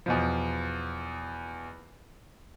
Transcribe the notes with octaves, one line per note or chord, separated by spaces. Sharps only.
E2 B2 F3